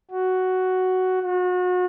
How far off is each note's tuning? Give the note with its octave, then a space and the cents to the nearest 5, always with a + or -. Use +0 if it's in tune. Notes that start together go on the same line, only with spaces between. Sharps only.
F#4 +5
F#4 -35